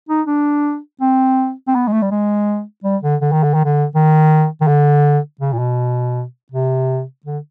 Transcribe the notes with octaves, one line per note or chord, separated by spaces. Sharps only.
D#4
D4
C4
C4
B3
G#3
A3
G3
G#3
G3
D3
D3
D#3
D3
D#3
D3
D#3
D#3
D3
C#3
A#2
B2
C3
D3